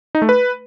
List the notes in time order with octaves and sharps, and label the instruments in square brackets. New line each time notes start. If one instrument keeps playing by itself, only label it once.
[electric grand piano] D#4
A3
B4